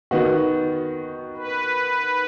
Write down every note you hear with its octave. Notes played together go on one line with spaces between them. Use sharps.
D#3 B3 F#4
B4